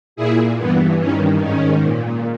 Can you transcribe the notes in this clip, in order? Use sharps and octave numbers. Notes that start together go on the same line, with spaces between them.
A#2 E4 G#4
G2 E3 B3
G2 D#3 C#4
G#2 D#3 C#4
A#2